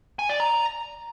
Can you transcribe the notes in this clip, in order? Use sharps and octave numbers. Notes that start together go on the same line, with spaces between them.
G#5
D5
A#5